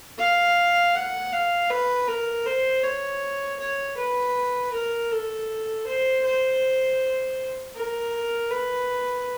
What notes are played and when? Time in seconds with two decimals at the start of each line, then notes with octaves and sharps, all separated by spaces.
0.19 F5
0.95 F#5
1.32 F5
1.70 B4
2.08 A#4
2.46 C5
2.83 C#5
3.60 C#5
3.97 B4
4.73 A#4
5.11 A4
5.87 C5
6.24 C5
7.76 A#4
8.52 B4